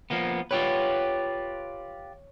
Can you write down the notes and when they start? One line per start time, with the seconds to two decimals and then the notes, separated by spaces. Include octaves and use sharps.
0.10 F3 A#3 B3
0.51 F4 G4 B4 C#5